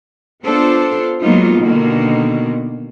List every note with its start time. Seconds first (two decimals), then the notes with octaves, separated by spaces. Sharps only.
0.43 B3 D4 F4 A4 C5
1.21 F#3 G#3 A#3 B3 D#4 F4
1.60 B2 D3 D#3 A#3